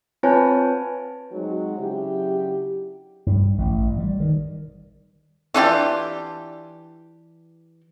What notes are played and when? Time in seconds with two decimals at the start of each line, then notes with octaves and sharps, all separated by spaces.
0.23 C4 F4 B4 C#5 G#5 A5
1.32 F#3 G#3 C4 D#4 F#4
1.78 C#3 F#3 D4 E4 G4
3.27 G2
3.58 A1
3.99 G3
4.20 D#3
5.54 E3 D4 F4 G4